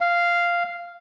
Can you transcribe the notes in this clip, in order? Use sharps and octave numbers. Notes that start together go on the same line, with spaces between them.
F5